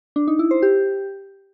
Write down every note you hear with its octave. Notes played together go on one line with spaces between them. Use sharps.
D4
D#4
E4
C5
G4